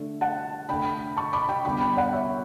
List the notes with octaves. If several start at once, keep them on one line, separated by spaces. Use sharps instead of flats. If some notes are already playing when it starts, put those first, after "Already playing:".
Already playing: D3 A3
F#5 A5
D3 A3 G5 B5
A5 C#6
B5 D6
G5 B5
D3 G3 B3 G5 B5
G5 B5
D5 F#5
C#5 E5